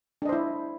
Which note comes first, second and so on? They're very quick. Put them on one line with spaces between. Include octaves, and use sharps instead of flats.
D4 D#5 C5 E4